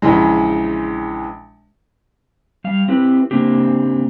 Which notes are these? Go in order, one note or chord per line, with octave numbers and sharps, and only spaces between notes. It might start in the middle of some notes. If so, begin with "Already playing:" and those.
A#1 C#3 E3 G#3
G3 F5
C4 E4 G4 B4
C#3 A#3 C4 D4 G4